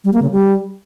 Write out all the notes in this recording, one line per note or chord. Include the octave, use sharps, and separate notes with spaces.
G3
A#3
C#3
G3